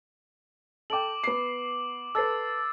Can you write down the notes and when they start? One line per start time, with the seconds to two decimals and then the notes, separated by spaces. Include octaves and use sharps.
0.90 A4 G5 D6 D7 F#7
1.24 B3 C7
2.15 A4 B4 E6 A6 C7